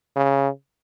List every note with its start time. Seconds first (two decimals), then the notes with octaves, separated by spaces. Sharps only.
0.16 C#3